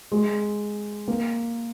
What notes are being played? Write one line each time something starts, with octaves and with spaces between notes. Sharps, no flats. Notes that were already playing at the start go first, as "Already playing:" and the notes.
G#3
A#3